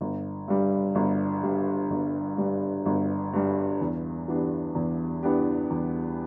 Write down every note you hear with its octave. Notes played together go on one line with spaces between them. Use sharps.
G1
G2 G3
G1
G2 G3
G1
G2 G3
G1
G2 G3
E2
E3 B3 D4 G4
E2
E3 B3 D4 G4
E2